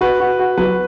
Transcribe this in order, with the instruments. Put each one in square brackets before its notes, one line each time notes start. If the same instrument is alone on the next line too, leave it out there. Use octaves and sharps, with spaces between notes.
[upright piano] F#4 [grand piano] B4
[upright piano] F#4
F#4
[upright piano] F#3 [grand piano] B4